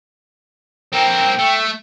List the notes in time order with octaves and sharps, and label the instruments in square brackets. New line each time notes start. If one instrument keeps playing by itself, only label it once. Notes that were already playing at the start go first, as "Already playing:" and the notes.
[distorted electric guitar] C4 A#4 [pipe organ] G5
[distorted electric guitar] A3